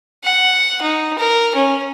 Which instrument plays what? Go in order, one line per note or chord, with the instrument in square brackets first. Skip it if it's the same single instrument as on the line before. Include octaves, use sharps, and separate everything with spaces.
[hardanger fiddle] F#5
D#4
A#4
C#4